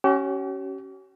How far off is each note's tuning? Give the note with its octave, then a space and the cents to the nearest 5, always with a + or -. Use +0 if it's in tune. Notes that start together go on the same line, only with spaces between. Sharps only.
C#4 +0 G4 -45